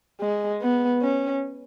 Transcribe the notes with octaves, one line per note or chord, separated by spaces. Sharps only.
G#3
B3
C#4